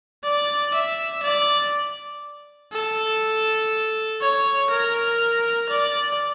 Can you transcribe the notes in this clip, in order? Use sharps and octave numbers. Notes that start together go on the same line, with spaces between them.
D5
E5
D5
A4
C#5
A#4
D5